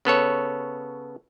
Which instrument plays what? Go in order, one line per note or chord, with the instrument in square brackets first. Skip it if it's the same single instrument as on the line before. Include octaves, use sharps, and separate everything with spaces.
[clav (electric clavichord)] C#3 B3 A4 C#5